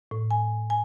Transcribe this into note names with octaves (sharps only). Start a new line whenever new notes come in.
A2
G#5
G#5